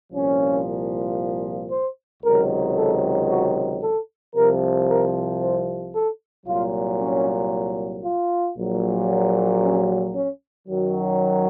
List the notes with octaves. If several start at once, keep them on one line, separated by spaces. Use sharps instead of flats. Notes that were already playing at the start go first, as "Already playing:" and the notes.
C2 A#2 F3 C#4
C5
C#2 C3 D#3 F#3 A#4
A4
F#4
A4
C2 C3 F3 A#4
A#4
C5
A4
C2 A#2 F#3 F4
C#4
F4
A#1 A#2 F#3
C#4
C#4
F#2 D#3 F#3